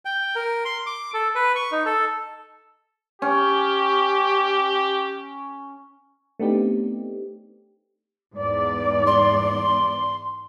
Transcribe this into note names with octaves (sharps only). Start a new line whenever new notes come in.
G5
A#4
C6
D6
A4
B4
C#6
D#4
A4
C#4 G4
A3 B3 C4 D4 D#4 G4
E2 G#2 D5
C6